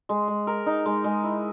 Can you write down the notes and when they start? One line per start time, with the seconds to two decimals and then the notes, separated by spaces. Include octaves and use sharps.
0.09 G#3
0.28 G#3
0.47 A#4
0.66 D#4
0.86 G#3
1.04 G#3
1.24 E4